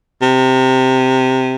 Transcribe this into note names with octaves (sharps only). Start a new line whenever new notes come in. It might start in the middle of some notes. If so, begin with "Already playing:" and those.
C3